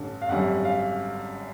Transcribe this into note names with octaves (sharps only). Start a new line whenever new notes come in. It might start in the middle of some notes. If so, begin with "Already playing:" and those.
Already playing: A1 G2 D3
F5
G#1 F#2 D3 G3 F#5
F5